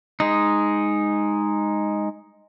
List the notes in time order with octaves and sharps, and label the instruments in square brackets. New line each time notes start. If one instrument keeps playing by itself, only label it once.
[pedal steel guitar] G#3 D#4